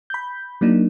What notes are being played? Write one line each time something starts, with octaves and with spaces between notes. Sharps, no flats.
B5 G6
F#3 A#3 D4 D#4